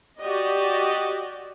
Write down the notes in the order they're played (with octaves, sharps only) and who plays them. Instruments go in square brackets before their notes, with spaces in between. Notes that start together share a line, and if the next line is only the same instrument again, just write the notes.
[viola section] F#4 G4 D5 D#5